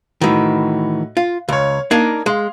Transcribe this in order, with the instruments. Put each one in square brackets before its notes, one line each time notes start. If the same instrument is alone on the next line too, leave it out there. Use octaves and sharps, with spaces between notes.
[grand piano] A2 D#4 F#4 [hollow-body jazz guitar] D#3 E3
[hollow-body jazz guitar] F4
[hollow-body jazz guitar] C#2 [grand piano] C#5 F5
[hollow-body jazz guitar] A#3 D4 D#4 [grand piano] G#6
[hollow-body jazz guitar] G#3 [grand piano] F5 C6